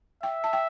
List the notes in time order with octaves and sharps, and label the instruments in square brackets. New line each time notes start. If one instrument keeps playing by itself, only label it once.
[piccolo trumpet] E5 [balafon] G5
[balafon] A5
G5